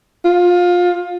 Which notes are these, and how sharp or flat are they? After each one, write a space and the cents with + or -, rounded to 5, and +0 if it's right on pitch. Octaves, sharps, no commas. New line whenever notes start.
F4 +20